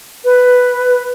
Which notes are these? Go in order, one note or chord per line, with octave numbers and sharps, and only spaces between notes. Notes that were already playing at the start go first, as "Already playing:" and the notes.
B4